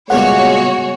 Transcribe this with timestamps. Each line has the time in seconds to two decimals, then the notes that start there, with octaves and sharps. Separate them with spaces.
0.10 A#2 C#3 G3 G#3 B3 F#4 C#5 F#5